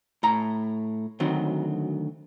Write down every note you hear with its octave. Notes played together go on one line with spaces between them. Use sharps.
A2 A#5
D2 D#3 F#3 C4